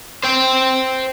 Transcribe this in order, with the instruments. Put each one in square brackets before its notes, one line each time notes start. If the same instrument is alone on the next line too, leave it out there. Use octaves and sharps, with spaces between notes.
[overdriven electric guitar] C5 G5